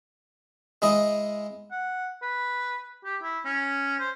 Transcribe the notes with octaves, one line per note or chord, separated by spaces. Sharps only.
G#3 E4 D#5
F#5
B4
G4
E4
C#4
C5